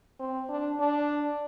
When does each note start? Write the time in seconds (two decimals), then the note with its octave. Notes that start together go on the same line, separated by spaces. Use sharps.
0.19 C4
0.49 D4
0.80 D4